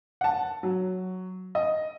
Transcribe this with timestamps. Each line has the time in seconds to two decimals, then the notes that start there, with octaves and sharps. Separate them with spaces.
0.21 F#5 A5
0.63 F#3
1.55 D#5